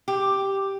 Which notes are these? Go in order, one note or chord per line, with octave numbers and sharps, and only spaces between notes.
G4